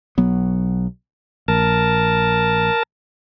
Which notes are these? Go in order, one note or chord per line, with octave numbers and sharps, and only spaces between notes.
B1 F#3 B3
A#1 A#4 A5